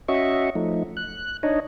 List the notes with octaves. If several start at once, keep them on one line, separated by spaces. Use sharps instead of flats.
C#4 F#4 D#5 E5 C#6
F3 A3 D#4
F#6
D4 D#4 C#5 D#5